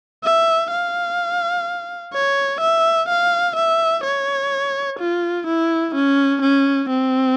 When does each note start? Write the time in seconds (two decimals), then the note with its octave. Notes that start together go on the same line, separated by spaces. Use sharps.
0.24 E5
0.71 F5
2.13 C#5
2.61 E5
3.09 F5
3.57 E5
4.04 C#5
5.00 F4
5.47 E4
5.95 C#4
6.42 C#4
6.90 C4